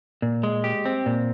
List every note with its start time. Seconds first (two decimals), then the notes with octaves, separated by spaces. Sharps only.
0.22 A#2
0.43 G#3
0.64 G4
0.86 C4
1.06 A#2